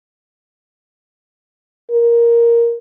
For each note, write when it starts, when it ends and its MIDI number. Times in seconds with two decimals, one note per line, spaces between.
1.91 2.76 70